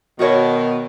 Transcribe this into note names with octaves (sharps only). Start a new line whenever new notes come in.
B2 D#3 F#4 A#4 C#5